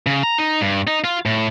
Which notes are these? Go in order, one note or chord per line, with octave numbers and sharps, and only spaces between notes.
C#3
A#5
D#4
G2
D#4
F4
A2